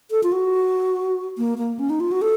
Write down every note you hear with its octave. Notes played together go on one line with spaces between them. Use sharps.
A4
F4
F#4
A#3
A#3
C#4
D#4
F4
F#4
A4